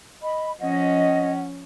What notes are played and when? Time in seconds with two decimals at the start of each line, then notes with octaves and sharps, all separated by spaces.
0.22 D#5 B5
0.60 F3 C#4 D#5 F#5